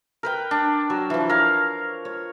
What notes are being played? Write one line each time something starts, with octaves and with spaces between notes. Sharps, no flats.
A#4 B4 G5
D4
F#3
E3 F3
A#4 C#5 F5
C#5